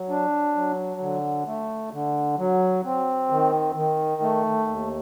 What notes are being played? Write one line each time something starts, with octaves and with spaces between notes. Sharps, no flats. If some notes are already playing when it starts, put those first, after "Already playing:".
Already playing: F#3
D4
F#3
D3
A3
D3
F#3
C4
D#3
D#3
A3
D#2